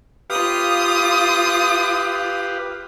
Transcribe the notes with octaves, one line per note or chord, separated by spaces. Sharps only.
F4 G4 B4 F5 D#6